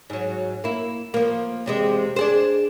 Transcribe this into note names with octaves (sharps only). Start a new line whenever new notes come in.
G#2 F#3
A#3 E4
F3 A#3
E2 C3 G#3
D4 G#4 C5